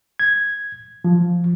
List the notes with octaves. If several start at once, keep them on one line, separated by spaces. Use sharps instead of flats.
G#6
F3